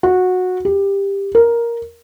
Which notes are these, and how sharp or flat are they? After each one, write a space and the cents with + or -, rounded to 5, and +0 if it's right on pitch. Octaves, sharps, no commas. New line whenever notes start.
F#4 -15
G4 +15
A#4 +5